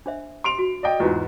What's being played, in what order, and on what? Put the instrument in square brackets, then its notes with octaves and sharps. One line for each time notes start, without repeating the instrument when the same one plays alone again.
[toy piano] D4 C5 E5
[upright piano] C6 D7 F7
[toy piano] F#4
[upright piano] D5 D#5 G5
[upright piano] E2 G#2 [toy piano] F4 F#4 B4